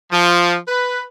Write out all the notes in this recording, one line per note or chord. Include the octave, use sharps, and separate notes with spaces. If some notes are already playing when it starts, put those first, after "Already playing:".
F3
B4